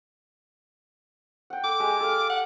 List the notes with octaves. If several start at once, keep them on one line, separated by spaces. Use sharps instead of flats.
F#5 G5
A4 D6
G#3 G4 G#5
A4 F5
F#5